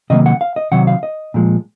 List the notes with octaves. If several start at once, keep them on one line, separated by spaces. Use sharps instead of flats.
C3 D#3 F#3 A#3 D#5
F#5
F5
D#5
C3 D#3 F#3 F#5
F5
D#5
A#2 F3 G#3